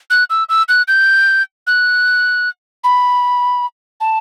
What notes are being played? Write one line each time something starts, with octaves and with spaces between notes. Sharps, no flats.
F#6
E6
E6
F#6
G6
F#6
B5
A5